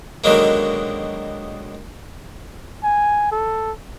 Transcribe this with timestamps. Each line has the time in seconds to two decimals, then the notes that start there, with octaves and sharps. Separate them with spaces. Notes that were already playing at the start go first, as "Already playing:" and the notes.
0.24 B2 D3 D#3 F#3 G#3 A#3
2.84 G#5
3.32 A4